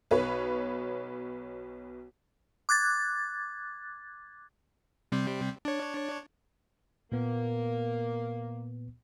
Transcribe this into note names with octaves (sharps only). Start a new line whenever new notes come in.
B1 B4 C#5
D6 F#6 G#6 A6
C3 G3 C4
D4 C#5
A#2 A#3 B3